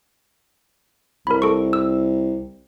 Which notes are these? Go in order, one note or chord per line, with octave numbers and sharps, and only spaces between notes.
C2 A#4 B5
A4 C#6
E6